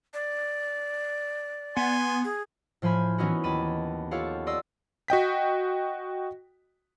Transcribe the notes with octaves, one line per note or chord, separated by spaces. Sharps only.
D5
B3 G#5 C6
G#4
A2 F3 C5 G#5 B5 F6
E3 B3 C#4 D#4 E4 F#4
D#2 A5 B5 D#7
F4 G4 A4 C#5 F5 F#5
D5 D#5 C6 E6
F#4 D#5 G5 B6